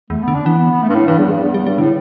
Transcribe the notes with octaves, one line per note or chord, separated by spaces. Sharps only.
E2 A3
B3
D3
D4
E3 B3
B3
B3
A3
G2
A2
G2 E3
E2 G3
G2
E2
E2 G3
G2 G3
A2 D3